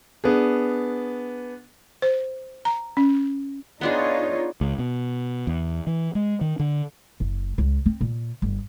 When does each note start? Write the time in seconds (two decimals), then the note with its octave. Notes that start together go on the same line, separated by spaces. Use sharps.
0.24 B3 D4 G#4
2.02 C5
2.65 A#5
2.97 C#4
3.81 B3 D4 D#4 F4 G#4 C#5
4.61 C#2
4.79 B2
5.47 E2
5.87 E3
6.15 G#3
6.41 D#3
6.59 D3
7.20 F#1
7.58 C#2
7.86 C4
8.01 A#2
8.42 G1